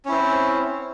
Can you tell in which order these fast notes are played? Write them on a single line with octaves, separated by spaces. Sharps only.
C#4 E4 C4